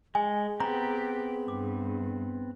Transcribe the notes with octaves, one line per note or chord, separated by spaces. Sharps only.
G#3 G#4 G#5
B3 C4 G4 A#5
G2 D6